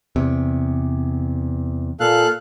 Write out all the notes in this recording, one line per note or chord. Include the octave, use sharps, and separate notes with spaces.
E2 C3
A#2 A4 F5 F#6